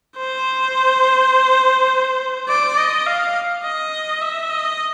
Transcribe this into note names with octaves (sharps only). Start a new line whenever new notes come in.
C5
D5
D#5
F5
D#5
E5
D#5